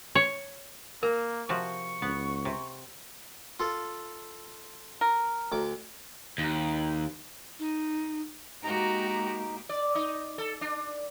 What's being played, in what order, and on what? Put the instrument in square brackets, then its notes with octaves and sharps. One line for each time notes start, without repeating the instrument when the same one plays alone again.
[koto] C#5
[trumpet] A#3 [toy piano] A#4 [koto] A#5
[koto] C3 F3 F#4 [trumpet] C#6
[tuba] C#2 [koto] B3 F#5
[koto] C3
[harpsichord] F4 A4
[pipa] A#4
[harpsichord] D2 D6
[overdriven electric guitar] D#2
[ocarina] D#4
[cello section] G#3 A#3 G4 [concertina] D#4 [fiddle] F#4 A#5
[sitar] D5
D#4
A4
D4